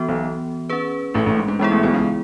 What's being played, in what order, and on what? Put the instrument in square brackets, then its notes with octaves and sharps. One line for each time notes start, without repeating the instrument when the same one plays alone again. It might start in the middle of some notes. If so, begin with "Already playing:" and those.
Already playing: [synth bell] E3 B3 F#4
[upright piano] B1 B2
[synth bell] C#4 G#4 B4
[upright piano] A1 A2
A1 A2
G#2
G#2
[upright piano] G#2 [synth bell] E3 G#3 B3 E4 G#4
[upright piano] A1 A2
B1 B2
C#2 C#3